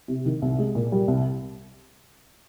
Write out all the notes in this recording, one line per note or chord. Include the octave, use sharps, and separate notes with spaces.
C3
D#3
C2
G#3
A#2
G3
C2